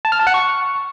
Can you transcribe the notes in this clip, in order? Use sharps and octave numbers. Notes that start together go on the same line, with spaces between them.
A5
F6
A5
F#5
C#6